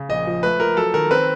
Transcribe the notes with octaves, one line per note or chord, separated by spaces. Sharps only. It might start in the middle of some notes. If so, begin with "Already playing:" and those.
Already playing: C#3
A#1 D#5
F3
A3 B4
F3 A#4
F#3 A4
D#3 A#4
C4 B4